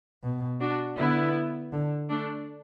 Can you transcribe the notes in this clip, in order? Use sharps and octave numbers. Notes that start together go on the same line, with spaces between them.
B2
D4 F#4
D3 B3 E4
D3
A3 D4